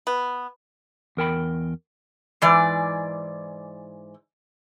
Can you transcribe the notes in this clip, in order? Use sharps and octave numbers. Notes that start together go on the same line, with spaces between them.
B3
E2 A#4 G5 B5
G#2 E3 D5